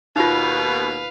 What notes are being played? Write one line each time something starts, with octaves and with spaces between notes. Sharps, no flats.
D#2 B2 D#4 F4 B4 F5